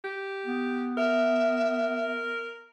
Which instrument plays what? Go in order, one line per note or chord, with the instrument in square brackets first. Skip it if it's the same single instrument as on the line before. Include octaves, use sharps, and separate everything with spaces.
[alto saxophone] G4
[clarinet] B3
[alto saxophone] A#4 [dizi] E5